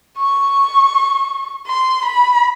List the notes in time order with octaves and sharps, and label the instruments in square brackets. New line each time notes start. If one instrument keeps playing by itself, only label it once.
[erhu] C#6
C6
B5